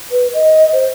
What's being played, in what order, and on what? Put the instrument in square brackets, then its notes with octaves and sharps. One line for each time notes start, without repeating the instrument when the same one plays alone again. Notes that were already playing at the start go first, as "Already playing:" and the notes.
[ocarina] B4
D#5
C5